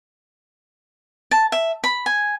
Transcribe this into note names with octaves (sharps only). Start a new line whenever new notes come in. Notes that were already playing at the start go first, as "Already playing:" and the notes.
A5
E5
B5
G#5